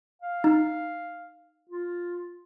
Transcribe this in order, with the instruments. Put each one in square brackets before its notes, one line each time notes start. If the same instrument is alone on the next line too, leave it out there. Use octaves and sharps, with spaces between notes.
[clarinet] F5
[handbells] D#4
[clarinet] F4